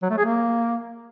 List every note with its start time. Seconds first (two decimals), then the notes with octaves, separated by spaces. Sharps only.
0.03 F#3
0.10 A3
0.18 G#4
0.26 A#3